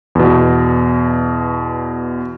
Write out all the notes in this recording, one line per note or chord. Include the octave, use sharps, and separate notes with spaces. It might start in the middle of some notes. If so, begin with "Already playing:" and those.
E2 B2